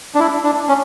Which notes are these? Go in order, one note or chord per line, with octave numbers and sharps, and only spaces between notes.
D4
E4
D4
C#4